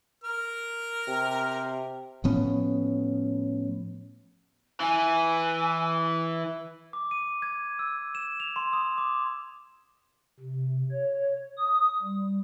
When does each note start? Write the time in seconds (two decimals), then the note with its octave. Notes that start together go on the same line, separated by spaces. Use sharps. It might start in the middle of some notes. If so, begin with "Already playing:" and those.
0.24 A#4 F6
1.08 C3
2.24 A2 F3 B3 C#4
4.80 E3 G#5
6.93 D6
7.11 D#7
7.42 G#6
7.79 E6
8.15 E7
8.40 F7
8.56 C6
8.73 D#6
8.98 D6
10.40 C3
10.91 C#5
11.57 D#6
12.02 G3